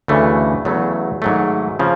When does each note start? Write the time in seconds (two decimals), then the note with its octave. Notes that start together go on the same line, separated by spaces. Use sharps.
0.08 D2 C#3 E3 A3
0.65 E2 C#3 F#3 A3
1.22 G#2 D#3 F#3 A3
1.79 C#3 F3